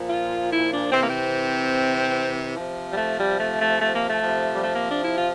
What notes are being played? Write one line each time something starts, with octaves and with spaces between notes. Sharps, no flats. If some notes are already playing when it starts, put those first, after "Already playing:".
Already playing: A#2 F3
F4
E4
D4
C3 E3 C4
A#3
C4
C3 F3
G3
A3
G3
A3
A3
A3
A#3
A3
C3 F3
G3
A3
A#3
D4
E4
F4